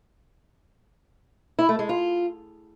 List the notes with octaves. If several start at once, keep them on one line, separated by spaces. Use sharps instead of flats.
E4
A3
G#3
F4